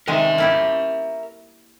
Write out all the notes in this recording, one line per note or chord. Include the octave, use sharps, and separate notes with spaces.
C3 D#3 G#3 A#4 E5
A#3 E4 G4